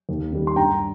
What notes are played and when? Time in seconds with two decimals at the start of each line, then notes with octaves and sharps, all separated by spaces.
0.09 D#2
0.32 D#3 G3
0.47 C6
0.56 G2 G5 A#5